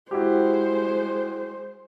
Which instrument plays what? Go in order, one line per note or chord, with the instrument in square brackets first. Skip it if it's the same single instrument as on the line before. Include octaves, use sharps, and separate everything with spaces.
[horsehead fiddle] G#3 C5 [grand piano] E4 F#4 G4